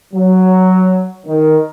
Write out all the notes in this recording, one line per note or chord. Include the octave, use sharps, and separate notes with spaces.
F#3
D#3